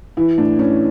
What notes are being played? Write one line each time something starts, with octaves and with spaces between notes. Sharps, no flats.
E3 E4
A2 D4
A2 C#4